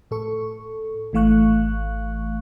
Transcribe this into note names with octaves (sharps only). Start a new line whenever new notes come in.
A2 A4 C#6
G#1 E3 A3 F5 C#6 F#6